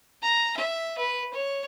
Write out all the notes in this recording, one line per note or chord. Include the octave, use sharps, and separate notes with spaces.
A#5
E5
B4
C#5